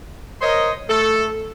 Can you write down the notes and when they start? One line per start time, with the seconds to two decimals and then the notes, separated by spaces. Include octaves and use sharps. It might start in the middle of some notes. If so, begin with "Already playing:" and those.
0.42 A#4 C5 C#5 D#5
0.89 A3 A4